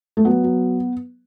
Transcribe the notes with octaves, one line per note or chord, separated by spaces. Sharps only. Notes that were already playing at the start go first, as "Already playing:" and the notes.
A3
F#3 B3
F#3